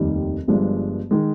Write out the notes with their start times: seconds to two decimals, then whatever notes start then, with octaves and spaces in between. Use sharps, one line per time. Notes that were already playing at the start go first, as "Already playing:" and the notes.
Already playing: F1 D#2 D#3 G3
0.48 G1 G2 F3 G#3
1.11 D#3 G#3